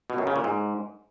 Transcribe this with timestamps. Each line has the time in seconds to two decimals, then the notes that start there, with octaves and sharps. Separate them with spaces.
0.10 B2
0.18 F#2
0.27 C#3
0.36 A#2
0.44 G#2